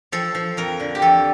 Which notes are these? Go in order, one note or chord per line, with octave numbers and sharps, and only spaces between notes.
F3 A4
F3
F2 A#4
D3
G4
F2 A4